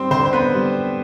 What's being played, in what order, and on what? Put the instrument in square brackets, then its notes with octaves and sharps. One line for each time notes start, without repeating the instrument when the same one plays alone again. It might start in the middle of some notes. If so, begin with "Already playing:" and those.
Already playing: [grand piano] G3 [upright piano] C4 C5
[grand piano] D3 [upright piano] C4 C5
[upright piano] C5
B3 B4
[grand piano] G3